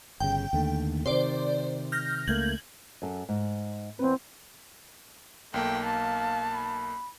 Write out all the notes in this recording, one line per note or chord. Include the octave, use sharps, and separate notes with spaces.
G1 C#3 G5
D#2 D3 A3
C3 D#3 C5 D5
F6 G6 A#6
C#2 A3 A#3 G6 G#6 F#7
F#2 A4
G#2
E2 C4 B4
B1 A3 A#3 G5
F5 A5
B5